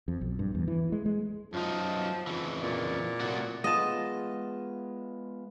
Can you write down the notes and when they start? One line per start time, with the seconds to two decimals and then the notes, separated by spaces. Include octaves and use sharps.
0.08 F2
0.21 B1
0.39 G2
0.55 E2
0.68 E3
0.92 G#3
1.06 G#3
1.54 F#2 F3 D#4
2.27 F2 C#3 E3
2.63 A#2
3.20 A2 C3 F#4
3.64 G#3 B3 F4 D#5 A5